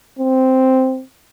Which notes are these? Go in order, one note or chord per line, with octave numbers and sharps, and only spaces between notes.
C4